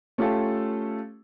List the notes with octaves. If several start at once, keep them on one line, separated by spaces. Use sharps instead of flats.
A3 C#4 F4 G4 A4